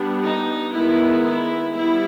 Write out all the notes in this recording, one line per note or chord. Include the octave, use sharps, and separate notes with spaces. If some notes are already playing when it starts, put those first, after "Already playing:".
Already playing: G3 B3 D4
D#4
D#3 G#3 B3 E4
E4
G3 B3 E4